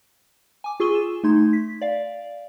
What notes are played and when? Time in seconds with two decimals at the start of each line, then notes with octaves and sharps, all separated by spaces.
0.64 G#5 D6
0.80 F4 G#4 C#6 E6 D#7 G7
0.95 E7
1.24 A3 D#4 C6 G#6
1.53 B6
1.81 D5 F5